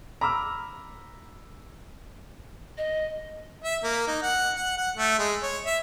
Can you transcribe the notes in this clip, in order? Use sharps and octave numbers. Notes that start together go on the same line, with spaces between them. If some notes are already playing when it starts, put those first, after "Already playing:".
A#5 B5 D6 E6 F6
D#5
E5
A#3
D#4
F#5
F#5
F#5
A3
G#3
C#5
E5